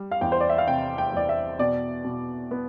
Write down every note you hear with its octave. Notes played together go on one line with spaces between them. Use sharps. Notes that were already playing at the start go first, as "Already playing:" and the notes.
Already playing: G3
F5
E2 G5
C5
D5
E5
F5
C3 G5
G5
E2 D5
E5
B2 D5
B2
B3